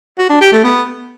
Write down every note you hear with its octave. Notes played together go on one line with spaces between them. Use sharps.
F#4
D4
G4
A3
B3